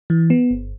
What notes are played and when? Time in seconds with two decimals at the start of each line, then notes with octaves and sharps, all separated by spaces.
0.10 E3
0.30 B3
0.51 G1